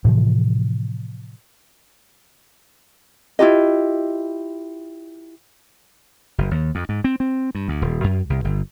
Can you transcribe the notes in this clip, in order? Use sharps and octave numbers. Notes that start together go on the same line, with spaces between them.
A2 C3 E3 F3
E4 F4 G4 D#5
F#1
D#2
F2
G#2
C4
C4
G2
D2
D#1
F#2
C2
G1